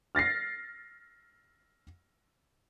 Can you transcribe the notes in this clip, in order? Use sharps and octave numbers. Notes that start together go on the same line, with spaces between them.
F6 A6 A#6 C7